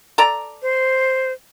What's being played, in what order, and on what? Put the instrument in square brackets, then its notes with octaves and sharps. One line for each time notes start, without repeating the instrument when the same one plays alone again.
[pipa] A4 D5 A#5
[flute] C5